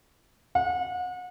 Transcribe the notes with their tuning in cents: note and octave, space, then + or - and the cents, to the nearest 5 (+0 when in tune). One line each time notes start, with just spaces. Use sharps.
F#5 -35